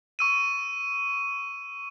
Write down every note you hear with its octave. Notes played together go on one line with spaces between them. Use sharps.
C#6 E6 D#7